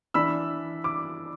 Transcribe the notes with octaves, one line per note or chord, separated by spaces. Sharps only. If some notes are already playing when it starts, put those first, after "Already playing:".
E3 D4 B5 E6
D6